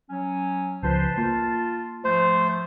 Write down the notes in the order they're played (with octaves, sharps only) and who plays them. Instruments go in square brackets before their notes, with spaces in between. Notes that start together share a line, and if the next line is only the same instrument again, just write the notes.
[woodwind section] F#3 C#4
[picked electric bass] C#2 F3 [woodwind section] B4 C5 [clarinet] A5
[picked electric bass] A#3 [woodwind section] F4
[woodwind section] G#2 F3 A3 [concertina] C5